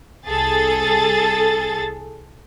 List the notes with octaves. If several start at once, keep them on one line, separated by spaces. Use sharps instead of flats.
C2 G#4 A4 A6